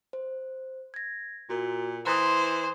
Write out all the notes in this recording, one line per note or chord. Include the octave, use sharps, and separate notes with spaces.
C5
G#6 A#6
A#2 F#4 A#4
E3 C5 A#5 D#6